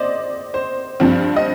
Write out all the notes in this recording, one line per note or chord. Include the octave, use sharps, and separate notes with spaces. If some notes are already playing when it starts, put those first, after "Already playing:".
Already playing: C5 D5 D#5
C5
G2 F3 C4
D#5